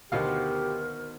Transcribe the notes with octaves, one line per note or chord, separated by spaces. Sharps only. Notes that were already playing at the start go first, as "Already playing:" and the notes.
D2 B2 D#3 B3 G4 A#4 C5 F5